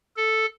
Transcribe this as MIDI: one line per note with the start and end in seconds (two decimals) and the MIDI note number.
0.17 0.46 69